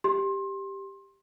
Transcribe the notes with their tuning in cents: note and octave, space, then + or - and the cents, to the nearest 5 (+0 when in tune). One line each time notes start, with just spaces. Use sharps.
G4 +0 C6 +25